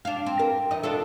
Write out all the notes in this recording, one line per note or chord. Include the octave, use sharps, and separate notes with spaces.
D4 F5
C4
A#4
E2 D#4 D#5
D4 F4 A4